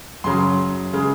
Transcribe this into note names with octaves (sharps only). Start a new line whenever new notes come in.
F#2 C#3 F#3 C6
C#3 G#3